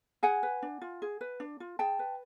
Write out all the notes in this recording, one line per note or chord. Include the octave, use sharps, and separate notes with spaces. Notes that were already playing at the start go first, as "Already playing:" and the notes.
G#4 F#5 G#5
B4
D4
F4
G#4
B4
D4
F4
G#4 G5 A5
B4